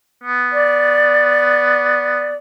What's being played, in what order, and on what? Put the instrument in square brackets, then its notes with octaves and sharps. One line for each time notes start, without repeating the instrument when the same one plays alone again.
[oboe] B3
[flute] D5